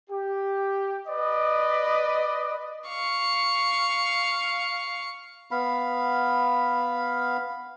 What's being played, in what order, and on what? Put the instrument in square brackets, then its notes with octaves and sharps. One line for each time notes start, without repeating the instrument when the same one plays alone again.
[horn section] G4
B4 D5 D#5
[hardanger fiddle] F5 C#6
[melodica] B3 F5 B5